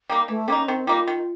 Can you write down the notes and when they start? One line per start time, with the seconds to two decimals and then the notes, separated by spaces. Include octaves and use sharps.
0.09 G3 A#3 D#4
0.28 E3 A3
0.48 G3 A#3 C#4 D#4
0.68 D#3 C4
0.87 G3 A#3 D#4 F4
1.07 D#3